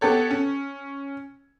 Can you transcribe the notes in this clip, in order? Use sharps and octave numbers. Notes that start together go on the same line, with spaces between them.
B3 G4 A4 C#5
C#4